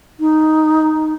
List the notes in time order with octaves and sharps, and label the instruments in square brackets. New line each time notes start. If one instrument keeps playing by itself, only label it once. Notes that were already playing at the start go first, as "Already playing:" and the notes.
[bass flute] D#4